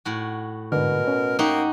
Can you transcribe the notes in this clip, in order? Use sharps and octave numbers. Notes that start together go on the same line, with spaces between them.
A2 F#4
G#2 B2 D3 A#4
C#4
A#3 D#4 F#4 G4